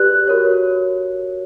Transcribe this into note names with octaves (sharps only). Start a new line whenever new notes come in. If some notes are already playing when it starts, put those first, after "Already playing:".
Already playing: G4 B4 D5 F#6
F#4 A#4 C#5